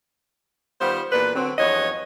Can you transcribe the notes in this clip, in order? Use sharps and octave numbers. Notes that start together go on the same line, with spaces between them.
D#3 G3 B3 F4 C5
E2 A#2 D4 B4
D3 F#3 C4
E2 G2 F3 B3 C#5 D#5